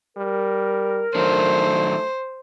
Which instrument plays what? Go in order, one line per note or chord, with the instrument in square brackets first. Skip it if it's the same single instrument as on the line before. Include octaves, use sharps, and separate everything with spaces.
[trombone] G3 [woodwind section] A#4
[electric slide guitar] D#3 F#3 D4 [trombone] A3 [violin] C5